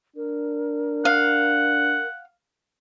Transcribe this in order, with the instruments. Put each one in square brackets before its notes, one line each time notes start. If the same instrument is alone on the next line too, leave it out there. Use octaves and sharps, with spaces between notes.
[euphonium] D4 [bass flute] A#4
[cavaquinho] F5 [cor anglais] F#5